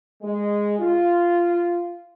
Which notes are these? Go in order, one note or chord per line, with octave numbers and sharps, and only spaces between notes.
G#3
F4